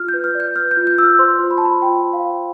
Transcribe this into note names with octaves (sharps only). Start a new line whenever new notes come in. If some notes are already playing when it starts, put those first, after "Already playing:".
Already playing: F4 F6
G6
B4
F6
D5
G6
B4 F6
G6
F4
G6
F4 E6
F6
C5 C6
F4
B5
A5
F4 B5
F4 G5
C5
F5
C5